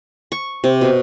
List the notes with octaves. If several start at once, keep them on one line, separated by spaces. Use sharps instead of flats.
C#6
C3
B2